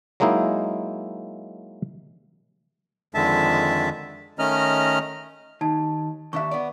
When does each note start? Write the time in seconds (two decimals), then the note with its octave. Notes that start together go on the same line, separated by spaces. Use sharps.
0.20 F#3 G#3 A#3 D#4 E4
3.15 F2 D3 D#3 G#3 E5 A5
4.39 D#3 A3 C#4 D#5 A#5 F6
5.61 D#2 D#4 A5
6.33 D#2 D4 E5 C#6
6.51 B3 D5